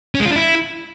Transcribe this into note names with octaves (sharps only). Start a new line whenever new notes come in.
C#4
G#3
F4
D4
E4